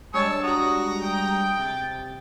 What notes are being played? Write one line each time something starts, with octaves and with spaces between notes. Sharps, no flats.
G3 G#3 D4 C#5 A5 E6
F#4 A#5 D#6
G5
C3 A6